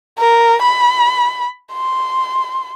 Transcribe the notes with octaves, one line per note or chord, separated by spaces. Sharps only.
A#4
B5
C6